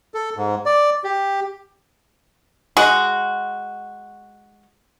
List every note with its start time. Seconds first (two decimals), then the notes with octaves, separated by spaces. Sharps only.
0.14 A4
0.37 G#2
0.66 D5
1.04 G4
2.77 G#3 F#4